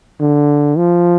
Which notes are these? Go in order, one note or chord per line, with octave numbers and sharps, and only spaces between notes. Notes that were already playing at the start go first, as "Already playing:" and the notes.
D3
F3